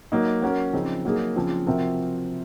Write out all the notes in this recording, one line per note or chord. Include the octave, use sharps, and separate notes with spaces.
F#3 A#3 D#4
F#3 C#4 F#4 A#4
C#3 F3 C4 D#4
F#3 A#3 D#4 G#4
C#3 F3 C4 F4
C3 F3 C4 F#4 A#4